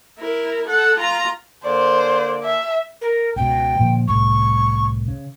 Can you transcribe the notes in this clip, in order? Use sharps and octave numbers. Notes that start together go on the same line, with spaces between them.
E4 A#4
A4 F#5
F4 A#5
D3 A#3 C5 D5
E5
A#4
C#2 B2 G5
A#2 D3 F3
C2 A2 C#6
C#3